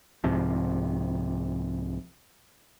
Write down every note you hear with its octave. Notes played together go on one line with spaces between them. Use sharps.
C2 G#2 C3 F3